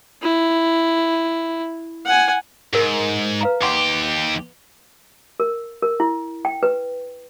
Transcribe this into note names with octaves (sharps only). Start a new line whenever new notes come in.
E4
F#5 G#5
G#2 G#4 A#4
B4 F5 A#5
D#2 G4 F#5 C6 D6
A#4
A#4
E4
G5
B4